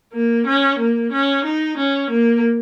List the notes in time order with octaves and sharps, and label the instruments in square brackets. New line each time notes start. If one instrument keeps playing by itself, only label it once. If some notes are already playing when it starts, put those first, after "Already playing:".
[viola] A#3
C#4
A#3
C#4
D#4
C#4
A#3